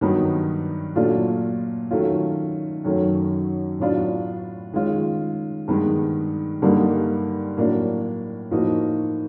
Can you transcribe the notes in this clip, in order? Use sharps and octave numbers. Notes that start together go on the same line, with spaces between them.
G2 D#3 F#3 B3 D#4
A#2 F#3 A3 D4 F4
D#3 F#3 A3 C#4 F4
F#2 D#3 F#3 A3 C#4
A2 F#3 B3 D4 F4
D#3 G#3 C#4 F4
G2 D#3 G#3 B3
G2 D3 G3 A#3 D#4
A2 F#3 A#3 D4
A2 F3 A#3 D#4 F#4